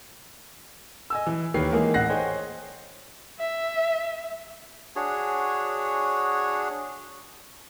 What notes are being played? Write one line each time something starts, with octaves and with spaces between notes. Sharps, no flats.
D#5 G#5 E6
E3
D#2 D#3 G4 B4 C#5 C7
E3 G#3 A#3 D#4 G#4 A#4
A1 F#5 F#6 A#6 C7
G#4 C5 C#5 D#5 G5
E5
D4 F#4 G#4 C#5